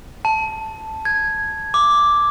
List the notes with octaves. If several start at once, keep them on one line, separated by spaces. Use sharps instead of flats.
A5
G#6
D6